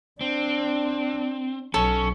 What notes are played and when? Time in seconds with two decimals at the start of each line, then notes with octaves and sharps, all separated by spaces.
0.21 C4 D4
1.74 B1 C#4 A4